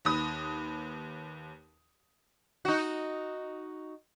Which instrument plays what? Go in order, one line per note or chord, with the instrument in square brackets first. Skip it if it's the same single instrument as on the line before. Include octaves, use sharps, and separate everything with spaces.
[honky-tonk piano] D#2 B4 D#6
[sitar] D#4 F#4